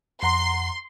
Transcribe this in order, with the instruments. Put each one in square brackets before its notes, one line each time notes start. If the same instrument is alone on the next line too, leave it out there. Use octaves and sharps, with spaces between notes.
[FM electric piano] F2 F#5 A#5 [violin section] C6